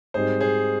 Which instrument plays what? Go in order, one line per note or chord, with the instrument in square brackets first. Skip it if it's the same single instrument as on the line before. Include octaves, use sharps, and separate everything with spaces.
[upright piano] G#2 G3 C4 D#4 [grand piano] G#4 C5
[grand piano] G#4 C5